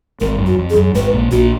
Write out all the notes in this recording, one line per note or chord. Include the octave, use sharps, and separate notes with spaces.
G#1 G#2 A#4
F#2
F#4
F2
G#4
F#2
G#1 G#2 B4
A#1 A#2
A#1 A#2 F#4